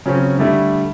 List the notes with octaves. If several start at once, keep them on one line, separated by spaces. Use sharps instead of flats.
C#3 F#3 C4 C#4
D3 G3 A3 E4